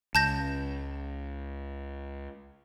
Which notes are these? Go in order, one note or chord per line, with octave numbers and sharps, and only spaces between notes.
C#2 A5 G6 A#6